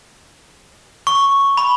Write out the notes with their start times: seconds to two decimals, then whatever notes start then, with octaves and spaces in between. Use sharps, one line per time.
1.07 C#6
1.57 B5